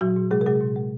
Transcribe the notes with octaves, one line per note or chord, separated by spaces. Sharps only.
A#2 F#3 F#4
A#2
C3 G#3 G#4
A#4
C3 G#3 G#4
A#2
G#3